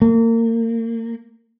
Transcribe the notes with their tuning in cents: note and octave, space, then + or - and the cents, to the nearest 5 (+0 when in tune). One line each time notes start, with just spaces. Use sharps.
A#3 -30